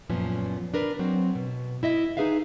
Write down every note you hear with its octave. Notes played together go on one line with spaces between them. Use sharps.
F#2 A#2 F3 B3 C#4
D4 A#4 B4
F#3 C4
B2
E4 D#5 E5
D#4 E4 G#4 B4 E5 F5